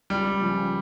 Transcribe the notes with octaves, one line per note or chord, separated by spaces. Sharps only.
C#2 G3
C#3 F3